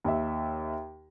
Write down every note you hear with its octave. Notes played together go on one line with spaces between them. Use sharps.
D#2 E5